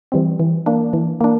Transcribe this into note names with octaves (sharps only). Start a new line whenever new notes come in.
E3 G3 C4
E3
A#3 D4
E3
A#3 D4